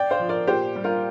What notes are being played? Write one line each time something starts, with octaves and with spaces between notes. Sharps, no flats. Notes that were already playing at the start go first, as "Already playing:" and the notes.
Already playing: D5 G5
C5 F5
F3
A#4 D5
A#2 G4 C5
G3
F4 A#4